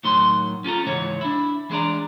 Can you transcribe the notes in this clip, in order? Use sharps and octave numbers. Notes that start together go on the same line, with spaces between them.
A2 D#3 F#3 C6
C#4 F4 A4 A#5
C#2 G#2 E3 C#5
D4 E4
E3 G#3 D4 D5 A#5